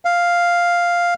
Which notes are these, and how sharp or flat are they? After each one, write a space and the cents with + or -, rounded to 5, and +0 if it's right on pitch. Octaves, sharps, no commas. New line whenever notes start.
F5 +0